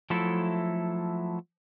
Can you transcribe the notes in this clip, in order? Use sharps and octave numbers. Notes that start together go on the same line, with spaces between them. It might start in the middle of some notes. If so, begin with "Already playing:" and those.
F3 F#3 A3 E4 A4